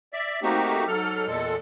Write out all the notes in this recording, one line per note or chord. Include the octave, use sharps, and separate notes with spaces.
D5 E5
A3 A#3 C4 D#4 F#4 G4
G#2 F#3 A4 F6
E2 A#2 G#3 A4